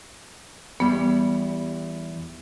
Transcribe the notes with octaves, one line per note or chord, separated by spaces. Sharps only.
E2 G3 B3